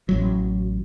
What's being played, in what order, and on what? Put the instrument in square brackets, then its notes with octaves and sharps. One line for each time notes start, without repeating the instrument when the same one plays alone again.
[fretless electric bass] A1 F#3